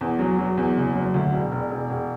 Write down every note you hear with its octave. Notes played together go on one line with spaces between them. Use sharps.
E2
F#3
F#3
E2
F#1
F#3
D2
E1
E1
E1
E1